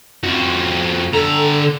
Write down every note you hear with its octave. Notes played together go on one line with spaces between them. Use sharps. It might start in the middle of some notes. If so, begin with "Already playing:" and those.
F2 F#4
D3 A4 A#5